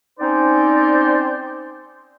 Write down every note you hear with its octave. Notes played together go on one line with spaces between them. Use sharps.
C4 C#4 D#4 C5 D5